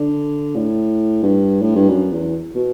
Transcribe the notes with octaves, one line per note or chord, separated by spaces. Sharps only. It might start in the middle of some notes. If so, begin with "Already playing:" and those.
Already playing: D3
A2
G2
A2
G2
F#2
E2
B2